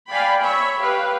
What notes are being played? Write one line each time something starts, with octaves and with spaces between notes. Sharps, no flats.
D5 F5 G5 G#5 B5
C#5 E5 B5
G4 B4 F5